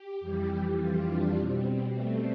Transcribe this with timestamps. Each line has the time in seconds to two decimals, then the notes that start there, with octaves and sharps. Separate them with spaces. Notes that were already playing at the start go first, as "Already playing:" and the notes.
Already playing: G4
0.20 F2 E3 G3
0.78 F4
1.06 D4
1.35 B2 G3 C4
1.64 C4
1.92 A3